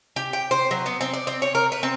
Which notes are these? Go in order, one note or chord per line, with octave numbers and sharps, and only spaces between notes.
G4
G5
C5
F#3
B3
C4
D5
C4
C#5
A#4
B4
C4